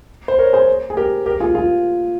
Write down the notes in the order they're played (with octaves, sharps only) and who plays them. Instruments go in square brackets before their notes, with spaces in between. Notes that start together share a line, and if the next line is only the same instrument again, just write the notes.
[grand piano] C5
A#4 C#5
G#4 C5
G#4
G4 A#4
G4 A#4
F4 G#4
F4 G#4